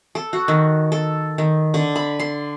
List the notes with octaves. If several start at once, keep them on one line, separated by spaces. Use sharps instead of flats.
A4
F#4
D#3
A4
D#3
D3
B5
C6